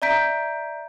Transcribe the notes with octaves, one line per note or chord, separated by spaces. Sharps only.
D5 E5 A#5 G6 B6 D7